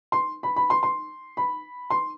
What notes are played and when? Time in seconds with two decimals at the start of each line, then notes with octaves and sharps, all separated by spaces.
0.12 C6
0.43 B5
0.56 B5
0.70 C6
0.83 C6
1.37 B5
1.90 C6